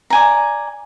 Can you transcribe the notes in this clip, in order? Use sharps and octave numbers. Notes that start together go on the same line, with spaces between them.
D5 G#5 A#5